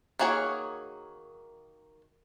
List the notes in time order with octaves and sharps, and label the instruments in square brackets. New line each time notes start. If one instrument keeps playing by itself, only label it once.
[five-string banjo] D#3 A#3 F#4 G#4 C#5